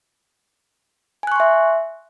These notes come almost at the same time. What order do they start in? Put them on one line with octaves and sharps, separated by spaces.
G#5 F#6 C#6 C6 E5